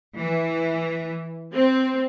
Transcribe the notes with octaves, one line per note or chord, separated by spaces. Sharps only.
E3
C4